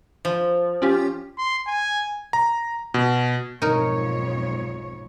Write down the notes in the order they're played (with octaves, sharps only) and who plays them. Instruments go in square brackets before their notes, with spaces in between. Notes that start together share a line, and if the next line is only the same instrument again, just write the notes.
[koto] F3
[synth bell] C#4 F4 G4
[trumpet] C6
G#5
[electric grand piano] A#5
B2
[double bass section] B1 G#2 F3 [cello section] F2 C#5 [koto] D#4 A#4